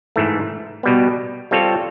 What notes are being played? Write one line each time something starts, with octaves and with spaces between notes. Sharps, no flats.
G#2 E3 A3
B2 G3 B3
G3 C4 F4 A4 C#5